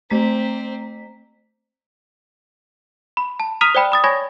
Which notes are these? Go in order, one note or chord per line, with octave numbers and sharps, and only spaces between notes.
A3 C4 A#5 B6
B5
A5
A#5 D#6 F6 B6 D#7 F7
C5 D5 G5 B5
B5 D#6 A6
C#5 G#5 B5 C#6 G#6 A#6